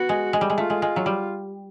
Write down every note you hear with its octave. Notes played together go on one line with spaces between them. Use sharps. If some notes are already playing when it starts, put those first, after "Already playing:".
Already playing: B3 F#4
G#3
G#3
G3
G#3
A3 F4
G#3
G#3
F#3
G3